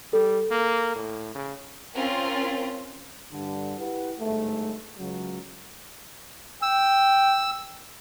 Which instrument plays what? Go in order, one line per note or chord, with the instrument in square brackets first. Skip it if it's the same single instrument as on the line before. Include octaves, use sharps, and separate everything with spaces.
[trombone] G3 [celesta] A4
[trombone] A#3
A2
C#3
[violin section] C4 C#4 F4 A#4
[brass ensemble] G2 D3
E4 G4 B4 F#5
G1 G#2 A3
C#2 C#3 F#3
[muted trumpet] G5 [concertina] E6